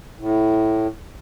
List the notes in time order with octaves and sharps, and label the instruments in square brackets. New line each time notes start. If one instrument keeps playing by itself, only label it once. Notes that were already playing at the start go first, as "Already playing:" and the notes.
[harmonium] A2